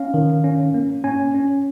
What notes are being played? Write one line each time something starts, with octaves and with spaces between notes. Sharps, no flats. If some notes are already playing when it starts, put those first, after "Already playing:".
Already playing: C#4 F5
D#3
C#4
A#3
C#4 G#5
C#4